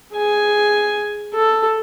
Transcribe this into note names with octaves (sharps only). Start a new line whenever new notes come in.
G#4 G#5
A4